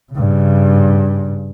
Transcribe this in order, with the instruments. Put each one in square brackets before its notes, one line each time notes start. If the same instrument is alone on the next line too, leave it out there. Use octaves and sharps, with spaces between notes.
[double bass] G2 C#3